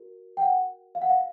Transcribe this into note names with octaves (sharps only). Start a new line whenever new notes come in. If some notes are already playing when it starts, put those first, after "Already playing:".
Already playing: F#4 A#4
G5
F#5
F5
F#5
F5